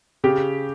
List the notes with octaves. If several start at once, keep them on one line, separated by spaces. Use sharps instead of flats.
C#3 G4